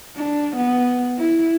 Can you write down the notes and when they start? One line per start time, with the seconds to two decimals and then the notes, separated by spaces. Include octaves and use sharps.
0.17 D4
0.56 B3
1.19 E4